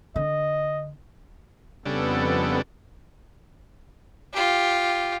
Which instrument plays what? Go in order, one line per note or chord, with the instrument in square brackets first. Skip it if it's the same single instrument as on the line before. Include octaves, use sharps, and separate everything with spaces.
[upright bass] D3 [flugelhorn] D#5
[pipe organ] F2 B3 A4 [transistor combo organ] C#3 G3 D4
[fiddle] F4 G4